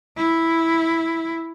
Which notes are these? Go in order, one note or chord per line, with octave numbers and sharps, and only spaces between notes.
E4